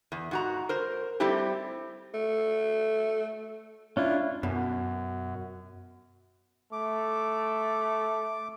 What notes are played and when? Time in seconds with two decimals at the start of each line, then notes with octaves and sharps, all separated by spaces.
0.12 E2
0.31 G#2 F#4 A#5
0.69 A#4 C5
1.20 G3 A3 C4 E4 G4
2.14 A3
3.97 C#4 D4 E4 F4
4.43 F#2 B2
6.72 A3 D6